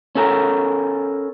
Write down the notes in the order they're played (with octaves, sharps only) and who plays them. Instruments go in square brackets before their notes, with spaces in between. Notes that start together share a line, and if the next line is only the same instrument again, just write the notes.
[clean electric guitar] C#4 A4 A#4